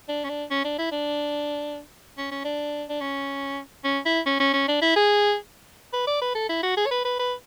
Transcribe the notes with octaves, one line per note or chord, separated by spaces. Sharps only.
D4
C#4
D4
C#4
D4
E4
D4
C#4
C#4
D4
D4
C#4
C#4
E4
C#4
C#4
C#4
D4
E4
G#4
B4
D5
B4
A4
E4
F#4
G#4
C#5
B4
B4
B4